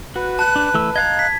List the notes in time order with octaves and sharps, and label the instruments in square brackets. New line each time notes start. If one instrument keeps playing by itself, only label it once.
[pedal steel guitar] F#4 [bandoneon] B4
[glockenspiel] A5 [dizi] F#6
[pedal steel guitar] D4
E3 A3 E6
[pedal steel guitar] D#5 F5 A#5 [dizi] F#6 [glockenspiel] G#6
[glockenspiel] B6